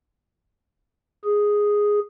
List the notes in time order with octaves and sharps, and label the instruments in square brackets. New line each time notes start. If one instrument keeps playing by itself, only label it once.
[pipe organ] G#4